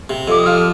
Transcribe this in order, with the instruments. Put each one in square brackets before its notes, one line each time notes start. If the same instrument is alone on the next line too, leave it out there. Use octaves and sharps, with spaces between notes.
[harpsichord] C3
[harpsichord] F2 [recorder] D6
[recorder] D#6
[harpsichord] F3 [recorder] F6